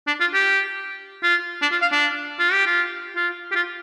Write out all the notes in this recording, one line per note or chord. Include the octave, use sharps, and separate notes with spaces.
D4
F4
G4
F4
D4
F4
F5
D4
F4
G4
F4
F4
G4
F4